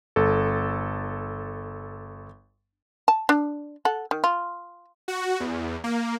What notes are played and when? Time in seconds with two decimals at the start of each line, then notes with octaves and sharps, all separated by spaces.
0.16 G1 A4
3.08 A5
3.29 D4
3.85 A4 F#5
4.11 D#3
4.24 F4
5.08 F#4
5.40 E2
5.84 A#3